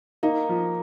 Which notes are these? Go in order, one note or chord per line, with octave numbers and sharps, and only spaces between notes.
A#3 D#4
F3